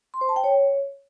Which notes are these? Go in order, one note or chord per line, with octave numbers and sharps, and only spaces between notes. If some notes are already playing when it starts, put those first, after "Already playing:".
C6
C5
A5
G5
C#5